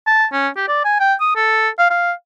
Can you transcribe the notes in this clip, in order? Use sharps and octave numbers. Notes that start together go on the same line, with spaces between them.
A5
C#4
G4
D5
G#5
G5
D#6
A4
F5
F5